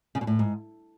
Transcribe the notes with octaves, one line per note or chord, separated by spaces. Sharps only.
C#3
B2
A2
G#2